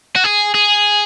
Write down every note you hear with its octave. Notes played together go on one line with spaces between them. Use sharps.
F#4
G#4
G#4